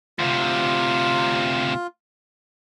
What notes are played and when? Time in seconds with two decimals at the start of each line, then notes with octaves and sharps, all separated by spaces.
0.19 D2 C3 F4